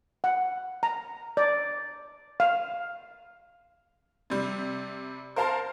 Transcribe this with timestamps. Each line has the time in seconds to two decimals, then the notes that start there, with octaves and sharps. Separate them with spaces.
0.24 F#5
0.83 A#5
1.37 D5
2.40 F5
4.30 C3 G3
5.36 A#4 C5 F5 A5 A#5 C6